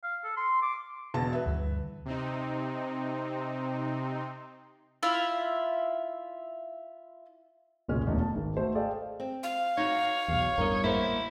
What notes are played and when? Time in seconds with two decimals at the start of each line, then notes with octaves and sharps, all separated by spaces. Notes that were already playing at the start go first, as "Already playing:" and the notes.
0.04 F5
0.24 A4
0.37 C6
0.62 D6
1.14 E1 B2 A5
1.33 B4 E5
1.46 D2 G2 E3
2.05 C3 C4 D#4
5.03 E4 F4 E5 F5
7.88 F1 C#2 A#2 G#3 C#4 F6
8.06 D1 E2 B2 A3 D#4
8.20 A5
8.35 G#1
8.57 A3 F#4 C5 D#5
8.75 G#4 A4 D5 D#5 F5 G5
9.20 C4
9.43 F5
9.77 D#4 F#4 C#5
10.28 B1 E2
10.58 A1 E2 G2 A#4 D#5
10.83 A#3 B3 E4 C5